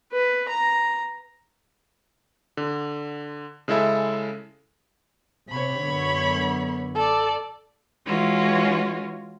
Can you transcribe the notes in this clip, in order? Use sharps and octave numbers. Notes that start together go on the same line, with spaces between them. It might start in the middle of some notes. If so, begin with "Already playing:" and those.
B4
A#5
D3
C#3 G#3 E4 A4 E5
C3 C4 C#5 B5
F#2 D3 B3
A4 D5
E3 G#3 C#4 F4 F#4